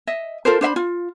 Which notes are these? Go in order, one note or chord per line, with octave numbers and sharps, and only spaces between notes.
D#5 E5
F4 A4 A#4 C5
D4 C5 E5 B5
F4